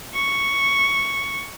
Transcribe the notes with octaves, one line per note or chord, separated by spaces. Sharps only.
C#6